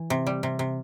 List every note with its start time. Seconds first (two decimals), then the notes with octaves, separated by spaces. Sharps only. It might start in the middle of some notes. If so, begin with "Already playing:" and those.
Already playing: E3
0.10 C3
0.27 G3
0.43 C3
0.59 C3